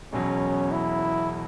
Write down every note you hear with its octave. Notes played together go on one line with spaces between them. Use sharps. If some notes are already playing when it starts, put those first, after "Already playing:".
E1 E2 B2 F#3 C#4
E4